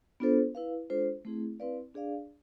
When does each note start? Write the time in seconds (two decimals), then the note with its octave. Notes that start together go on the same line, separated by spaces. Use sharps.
0.20 B3 D4 F4 A4 C5
0.55 E4 B4 F5
0.90 G#3 D4 F4 A4 C5
1.25 A3 C4 E4 G#4
1.60 C4 E4 B4 D5 F5
1.94 D4 G#4 D5 F5